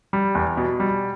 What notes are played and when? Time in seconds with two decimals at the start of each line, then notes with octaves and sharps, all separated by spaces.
0.13 G3
0.35 E2
0.57 B2
0.80 G3